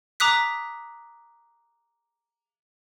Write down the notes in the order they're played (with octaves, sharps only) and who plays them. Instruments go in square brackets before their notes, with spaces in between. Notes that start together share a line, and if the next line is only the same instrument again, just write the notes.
[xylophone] A#5 D6 D#6 F#6 B6